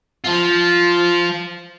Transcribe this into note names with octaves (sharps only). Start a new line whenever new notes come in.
F3 F4